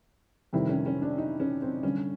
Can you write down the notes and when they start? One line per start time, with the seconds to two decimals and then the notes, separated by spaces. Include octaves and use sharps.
0.53 F2 C3 D#3 G3 E4
0.69 C#4
0.86 C#4
1.02 D4
1.18 D#4
1.40 C#4
1.62 C4
1.83 G1 G2 D3 C#4